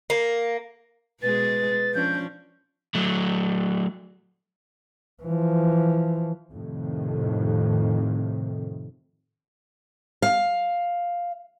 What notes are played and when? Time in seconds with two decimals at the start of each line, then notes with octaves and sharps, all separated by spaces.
0.10 A#3
1.22 B2 G#3 G#4 B4 A6
1.94 F3 C#4 D4 G6
2.95 F#3 A3
5.23 E3 F3
6.52 F2 A2 C3 D#3
10.22 F5